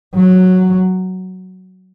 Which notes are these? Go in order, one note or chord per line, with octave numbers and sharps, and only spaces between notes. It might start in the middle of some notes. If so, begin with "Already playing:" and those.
F#3